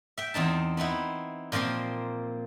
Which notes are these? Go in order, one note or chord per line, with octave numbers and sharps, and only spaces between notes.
E5 G5
E2 C4 D#4 A5
B3 C4 D#4 E4
A#2 F3 A#3 C4 C6